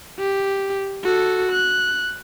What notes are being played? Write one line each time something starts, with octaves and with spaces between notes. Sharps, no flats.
G4
F#4 A4
F#6